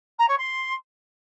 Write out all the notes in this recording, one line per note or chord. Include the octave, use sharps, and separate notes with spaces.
A#5
C#5
C6